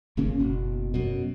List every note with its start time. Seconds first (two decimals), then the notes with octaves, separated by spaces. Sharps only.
0.17 G1 C#3 A#3 C#4
0.39 F#1 B2
0.94 F#2 B2